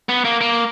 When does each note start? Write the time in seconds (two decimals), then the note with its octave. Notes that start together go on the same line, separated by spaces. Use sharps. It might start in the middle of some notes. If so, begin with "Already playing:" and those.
0.09 B3
0.25 A#3
0.41 A#3